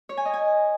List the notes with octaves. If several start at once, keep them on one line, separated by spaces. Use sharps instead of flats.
C#5
G#5
D#5
G#5